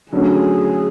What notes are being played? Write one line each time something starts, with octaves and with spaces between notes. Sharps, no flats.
D3 F#3 A3 C#4 G#4